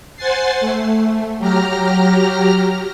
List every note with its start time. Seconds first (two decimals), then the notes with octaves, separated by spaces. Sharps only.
0.17 C5 F#5 G#5 A6 C7
0.60 A3
1.39 F#3 G4 A#5 F6 A#6